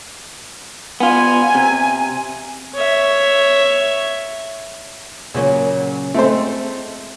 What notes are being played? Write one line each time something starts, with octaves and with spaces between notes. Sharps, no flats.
B3 F4 G#5
C3
C#5 E5
A#2 C#3 F#3 A#3 C#4
G#3 A3 C4 C5